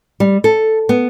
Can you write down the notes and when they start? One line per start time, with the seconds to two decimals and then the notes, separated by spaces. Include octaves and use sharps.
0.20 G3
0.44 A4
0.89 B3